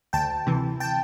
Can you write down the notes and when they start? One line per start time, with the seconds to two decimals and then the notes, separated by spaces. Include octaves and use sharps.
0.13 D2 G5 A5
0.47 C3 E3
0.80 G5 A5